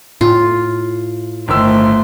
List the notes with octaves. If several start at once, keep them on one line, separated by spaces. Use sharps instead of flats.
A2 F4
G1 D#3 A3 C5 E6